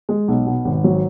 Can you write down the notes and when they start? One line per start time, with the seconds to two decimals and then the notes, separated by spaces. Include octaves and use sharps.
0.09 G#3
0.28 B1
0.47 B2
0.65 G#1
0.84 F#3